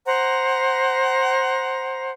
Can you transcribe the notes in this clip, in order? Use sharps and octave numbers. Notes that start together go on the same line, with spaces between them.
C5 F#5 A#5